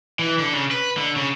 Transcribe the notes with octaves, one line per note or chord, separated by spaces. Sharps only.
E3
D3
C#3
B4
D3
C#3